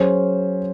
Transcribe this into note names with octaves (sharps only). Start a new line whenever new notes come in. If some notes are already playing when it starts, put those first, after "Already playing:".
Already playing: F#3 C#4 G#4 C5